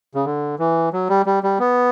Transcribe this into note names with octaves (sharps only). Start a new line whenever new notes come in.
C#3
D3
E3
F#3
G3
G3
G3
B3